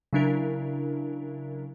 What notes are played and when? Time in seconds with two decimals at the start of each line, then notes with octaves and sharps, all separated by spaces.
0.13 C#3 F#3 D4 E4 A#4